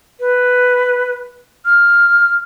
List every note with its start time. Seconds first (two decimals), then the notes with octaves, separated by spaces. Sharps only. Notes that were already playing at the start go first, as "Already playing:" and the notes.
0.20 B4
1.66 F6